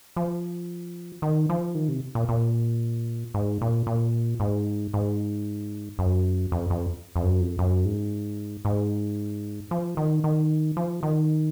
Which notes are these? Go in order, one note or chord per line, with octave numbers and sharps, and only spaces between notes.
F3
D#3
F3
D#3
C3
A#2
A#2
G#2
A#2
A#2
G#2
G#2
F#2
F2
F2
F2
F#2
F2
F#2
G#2
G#2
F3
D#3
D#3
F3
D#3